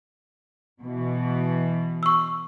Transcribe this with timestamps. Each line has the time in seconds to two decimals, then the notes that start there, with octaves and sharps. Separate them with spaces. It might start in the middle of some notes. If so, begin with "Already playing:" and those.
0.82 B2 E3
2.03 C#6 E6